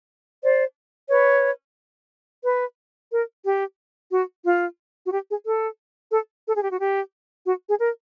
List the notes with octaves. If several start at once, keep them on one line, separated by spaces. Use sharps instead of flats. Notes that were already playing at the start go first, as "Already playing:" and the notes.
C5 D5
B4 C#5
B4
A#4
G4
F#4
F4
F#4
G4
G#4
A4
A4
A4
G#4
G4
F#4
G4
F#4
G#4
A#4